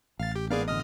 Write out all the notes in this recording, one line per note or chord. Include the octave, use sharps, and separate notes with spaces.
A1 F5 A6
G4
G#2 A#3 B3 G#4 D5 F5
B2 D3 D#5 D#6 F6